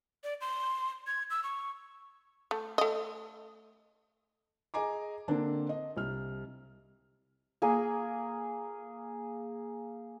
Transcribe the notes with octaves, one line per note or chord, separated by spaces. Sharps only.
D5
C6
G#6
E6
C#6
A3
A3 D#5
G#4 D#5 G#5 A#5 D6
D3 A#3 C4 D4
D#5
C2 F6
A#3 G#4 G#5